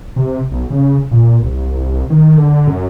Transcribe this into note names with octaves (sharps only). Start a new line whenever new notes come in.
C3
B1
C#3
A#2
C2
D#3
D3
F#2